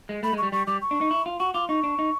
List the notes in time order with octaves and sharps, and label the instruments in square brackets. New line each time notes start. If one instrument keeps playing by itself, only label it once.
[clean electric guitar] G#3
[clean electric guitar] A3 [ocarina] B5
[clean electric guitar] G#3
[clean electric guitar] G3 [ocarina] C#6
[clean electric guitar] G3 [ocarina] C#6
[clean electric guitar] G3 [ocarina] D6
[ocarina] C#6
[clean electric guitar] D4
D#4
E4
F4
[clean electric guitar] F#4 [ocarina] C#6
[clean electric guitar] F4 [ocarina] D6
[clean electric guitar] D#4 [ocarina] C#6
[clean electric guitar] D4
D#4